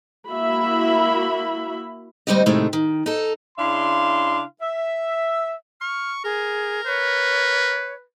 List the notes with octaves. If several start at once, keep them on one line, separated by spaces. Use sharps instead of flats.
A#3 E4 F#4 E5 B5
D2 G3 C4 D#4 G4 D#5
A2 C3 D#3 G#3 A3
D#3
D#4 A4
C#3 D4 E4 F5 C6
E5
C#6 F6
G#4 A#4
B4 C#5